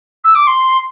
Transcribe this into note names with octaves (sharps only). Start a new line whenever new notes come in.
E6
D6
C6